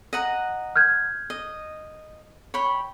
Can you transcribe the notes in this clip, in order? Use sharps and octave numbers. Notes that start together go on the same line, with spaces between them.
D#5 F#5 A#5
F6 G6 G#6
D#5
C#5 G5 B5